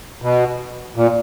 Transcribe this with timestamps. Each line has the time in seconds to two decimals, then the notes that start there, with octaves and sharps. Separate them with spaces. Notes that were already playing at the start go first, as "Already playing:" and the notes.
0.22 B2
0.96 A#2